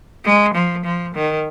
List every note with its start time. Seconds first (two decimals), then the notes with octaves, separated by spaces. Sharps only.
0.25 G#3
0.55 F3
0.85 F3
1.15 D#3